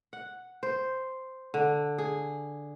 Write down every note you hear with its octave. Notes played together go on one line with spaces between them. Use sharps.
F#5
C5
D3
G#4